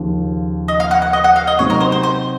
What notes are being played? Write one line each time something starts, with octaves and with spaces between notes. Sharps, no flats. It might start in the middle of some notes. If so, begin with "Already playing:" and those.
Already playing: D#2 C#3 F3
D#5
F5
F#5
F#5
D#5
F#5
F5
D#5
C3 F#3 C4 D#4 C#5
A#4
C5
C5
C5